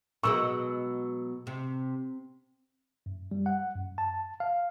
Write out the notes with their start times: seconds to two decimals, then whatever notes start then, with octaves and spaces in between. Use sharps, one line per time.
0.23 B2 F#3 G#3 C#6 E6
1.47 C3
3.06 F#2
3.31 G3
3.46 F#5
3.76 F#2
3.98 A5
4.40 F5